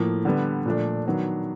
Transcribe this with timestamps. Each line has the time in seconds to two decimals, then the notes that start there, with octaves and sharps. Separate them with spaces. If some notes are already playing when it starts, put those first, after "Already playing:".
Already playing: A2 F3 A#3
0.25 D3 G3 B3
0.66 A#2 F3 A3 D4
1.06 D#3 F#3 B3 D4